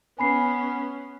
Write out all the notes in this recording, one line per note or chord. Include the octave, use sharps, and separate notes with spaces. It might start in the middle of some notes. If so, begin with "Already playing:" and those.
B3 C#4 G#5 B5 C7